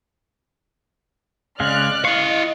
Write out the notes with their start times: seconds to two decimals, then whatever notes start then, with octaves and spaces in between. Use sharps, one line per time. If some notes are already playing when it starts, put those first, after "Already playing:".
1.60 C#3 G#3 D5 F5 F6 F#6
2.05 E4 D#5 F5 C#6